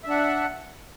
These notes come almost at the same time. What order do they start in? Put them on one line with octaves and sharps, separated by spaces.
E5 D4 F#5